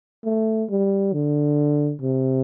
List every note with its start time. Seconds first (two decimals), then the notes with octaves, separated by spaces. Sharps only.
0.24 A3
0.70 G3
1.13 D3
2.02 C3